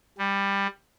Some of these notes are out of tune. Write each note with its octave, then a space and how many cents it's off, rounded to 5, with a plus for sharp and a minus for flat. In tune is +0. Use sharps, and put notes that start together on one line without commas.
G3 +15